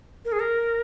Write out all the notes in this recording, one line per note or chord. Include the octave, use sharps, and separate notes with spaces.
A#4
G#4
A#4